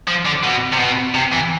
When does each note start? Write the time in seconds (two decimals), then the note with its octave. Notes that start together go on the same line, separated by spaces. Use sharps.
0.08 F3
0.26 D3
0.44 B2
0.73 C3
0.79 B2
1.15 C3
1.33 E3